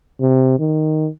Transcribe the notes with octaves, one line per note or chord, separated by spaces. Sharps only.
C3
D#3